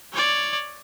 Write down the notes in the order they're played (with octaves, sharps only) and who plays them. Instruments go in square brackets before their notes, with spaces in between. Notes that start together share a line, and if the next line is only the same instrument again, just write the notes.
[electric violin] C#5 D5